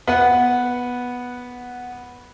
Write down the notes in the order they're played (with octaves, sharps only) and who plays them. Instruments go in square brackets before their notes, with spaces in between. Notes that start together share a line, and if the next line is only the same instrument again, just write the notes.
[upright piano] B3 F#5